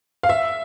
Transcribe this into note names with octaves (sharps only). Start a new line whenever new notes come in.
F5
E5